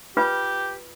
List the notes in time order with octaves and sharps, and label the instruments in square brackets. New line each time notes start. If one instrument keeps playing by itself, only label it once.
[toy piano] F4 B4 [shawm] G4